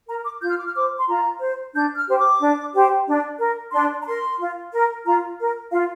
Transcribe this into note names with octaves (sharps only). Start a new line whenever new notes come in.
A#4 A#5
D6
F4 G6
F6
D6
F6
C5 D6
C6
F4 A#5
C5
D4 G6
F6
G4 C5
D6
D4
G4 C5
D4
A#4
D4 C6
A#5
A#4 C6
F4
A#4
F4 A#5
A#4
F4 F5